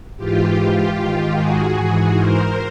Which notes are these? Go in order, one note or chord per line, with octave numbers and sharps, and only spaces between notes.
G#2 E3 F4 G4
G#2 D#3
F#4 G#4
G#2 E3
A#4 C5